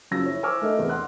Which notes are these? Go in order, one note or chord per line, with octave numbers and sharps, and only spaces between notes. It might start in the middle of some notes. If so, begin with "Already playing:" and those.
F#1 C#3 F3 F#3 E6 A#6
E4 C#5
C5 G#5 C#6 D6 E6 F6
A3 D4 A4 A#4 D#5 E5
E2 C3 B3
F#5 C6 F#6